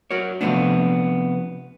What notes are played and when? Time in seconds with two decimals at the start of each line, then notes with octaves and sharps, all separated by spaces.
0.11 F#4 A#4 C#5
0.41 C3 F3 F#3 A3 B3 D4